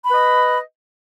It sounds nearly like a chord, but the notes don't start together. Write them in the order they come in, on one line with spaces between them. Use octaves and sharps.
B5 B4 D#5